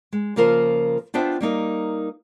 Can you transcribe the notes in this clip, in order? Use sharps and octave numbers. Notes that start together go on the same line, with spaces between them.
G#3
C#3 F3 A#3 F4 A#4 C5
B3 D4 F4 C5 E5 G5
G3 A#3 D#4 A#4